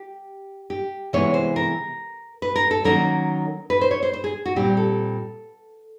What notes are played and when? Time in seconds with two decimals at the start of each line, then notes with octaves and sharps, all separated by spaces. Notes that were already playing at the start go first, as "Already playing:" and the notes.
Already playing: G4
0.70 G4
1.13 C3 E3 G#3 B3 C#5
1.34 C5
1.56 A#4
2.42 B4
2.56 A#4
2.71 A4
2.84 D#3 F#3 A#3 C#4 A#4
3.70 B4
3.81 C5
3.91 C#5
4.03 C5
4.13 C5
4.24 G#4
4.46 F#4
4.56 A#2 G3 C4 G4
4.77 A4